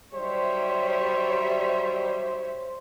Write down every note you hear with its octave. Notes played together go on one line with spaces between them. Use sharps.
D#3 F#3 G3 C5 C#5 E5